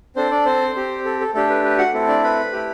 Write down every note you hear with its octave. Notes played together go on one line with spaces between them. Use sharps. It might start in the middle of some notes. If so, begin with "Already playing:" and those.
C4 D4 A4 C5
D4 D5
C4 C5
C4 G4
A4
A4
A3 D4 G4 A4
B4
B4
F#4 F#5
A3 C4 E4 A4
D4 D5
B4 B5
A3 E4 G4